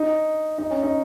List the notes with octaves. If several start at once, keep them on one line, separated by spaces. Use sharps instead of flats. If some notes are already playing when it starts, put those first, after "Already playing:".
Already playing: D#4
D#4
C#4
D#4